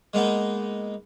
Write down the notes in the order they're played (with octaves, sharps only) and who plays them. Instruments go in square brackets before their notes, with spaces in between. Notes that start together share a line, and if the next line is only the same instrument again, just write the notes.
[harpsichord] G#3 A#3 B3 D#4